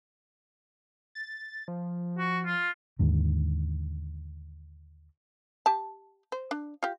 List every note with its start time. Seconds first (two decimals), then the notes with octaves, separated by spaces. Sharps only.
1.15 A6
1.68 F3
2.18 F#4
2.46 F4
2.99 D#2 G#2 D3
5.66 G4 A5
6.32 C5
6.51 D4
6.83 F4 G4